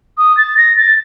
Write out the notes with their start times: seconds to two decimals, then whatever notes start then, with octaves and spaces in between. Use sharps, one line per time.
0.18 D#6
0.37 A6
0.57 A#6
0.77 A6